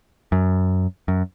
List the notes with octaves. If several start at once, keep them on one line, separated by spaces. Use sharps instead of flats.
F#2
F#2